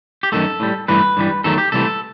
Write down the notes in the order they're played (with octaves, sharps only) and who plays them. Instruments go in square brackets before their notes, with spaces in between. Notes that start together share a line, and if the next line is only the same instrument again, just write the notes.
[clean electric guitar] G4
F#2 D#3 A3 A4
A2 G3
G2 E3 A3 B4
G2 E3 G3
E2 D#3 F#3 A3 A4
G4
C2 C3 E3 A3 A4